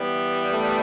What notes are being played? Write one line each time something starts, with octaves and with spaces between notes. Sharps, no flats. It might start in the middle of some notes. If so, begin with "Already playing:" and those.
Already playing: E3 G3 B3
A3